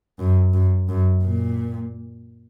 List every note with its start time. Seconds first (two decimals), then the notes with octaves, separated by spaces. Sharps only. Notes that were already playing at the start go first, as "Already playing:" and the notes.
0.19 F#2
0.54 F#2
0.89 F#2
1.24 A#2